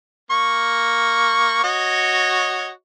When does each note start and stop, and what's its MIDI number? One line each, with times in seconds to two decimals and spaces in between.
0.31 1.62 58
0.31 1.62 85
1.64 2.69 66
1.64 2.69 73
1.64 2.69 75